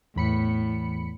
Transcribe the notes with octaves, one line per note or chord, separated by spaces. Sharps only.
E2 A2 B5 C#7